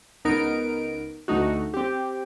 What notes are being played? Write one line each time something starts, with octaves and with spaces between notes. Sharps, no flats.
C#2 B3 D#4 A#4 D7
D2 A3 D#4 F#4
C4 G4